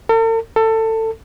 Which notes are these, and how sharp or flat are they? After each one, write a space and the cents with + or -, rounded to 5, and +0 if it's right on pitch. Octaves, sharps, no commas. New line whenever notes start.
A4 +45
A4 +20